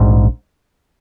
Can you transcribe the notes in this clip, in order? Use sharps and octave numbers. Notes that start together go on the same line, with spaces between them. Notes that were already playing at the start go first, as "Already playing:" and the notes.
Already playing: A#1 G#2